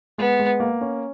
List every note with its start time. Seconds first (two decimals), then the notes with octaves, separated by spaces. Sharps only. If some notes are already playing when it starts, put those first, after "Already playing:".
0.18 G#3 B3
0.39 G#3
0.60 A#3
0.81 C#4